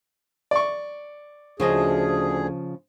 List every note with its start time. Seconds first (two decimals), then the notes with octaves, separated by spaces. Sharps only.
0.51 D5 C#6
1.60 D2 C#3 F3 G#4 D#5